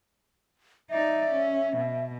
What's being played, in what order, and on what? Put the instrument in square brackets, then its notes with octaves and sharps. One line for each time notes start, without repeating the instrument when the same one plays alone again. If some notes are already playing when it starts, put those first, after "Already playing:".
[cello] D#4 D5 [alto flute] E5
[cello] C#4
B2